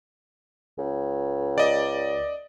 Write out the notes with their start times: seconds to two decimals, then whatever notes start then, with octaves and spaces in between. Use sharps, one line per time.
0.78 C#2
1.58 D5 D#5